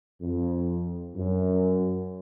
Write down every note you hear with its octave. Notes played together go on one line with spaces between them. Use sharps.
F2
F#2